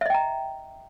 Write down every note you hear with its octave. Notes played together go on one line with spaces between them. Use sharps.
D#5 E5 G5 A#5